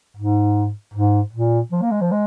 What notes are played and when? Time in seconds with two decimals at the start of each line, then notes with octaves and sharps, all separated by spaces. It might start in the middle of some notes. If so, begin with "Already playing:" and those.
0.17 G#2
0.94 G#2
1.33 A#2
1.72 F3
1.82 A#3
1.92 G#3
2.01 F3
2.11 G#3